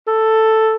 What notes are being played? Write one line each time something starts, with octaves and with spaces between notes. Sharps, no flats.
A4